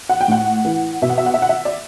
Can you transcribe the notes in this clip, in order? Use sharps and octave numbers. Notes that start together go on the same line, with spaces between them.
F#5
G5
A2 F#5
E3
B2 E5
F#5
E5
F#5
E5
F#5
E5
D5